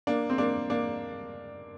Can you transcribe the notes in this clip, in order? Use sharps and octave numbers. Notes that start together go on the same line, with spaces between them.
A#3 D4
C4
A#3 D4
A#3 D4